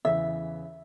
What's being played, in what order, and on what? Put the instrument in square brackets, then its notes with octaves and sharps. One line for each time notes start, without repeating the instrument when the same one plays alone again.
[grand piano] E2 C#3 E3 [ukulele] E5